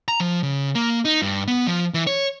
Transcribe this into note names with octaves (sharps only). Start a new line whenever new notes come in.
A#5
F3
C#3
A#3
D#4
G2
B3
F3
E3
C#5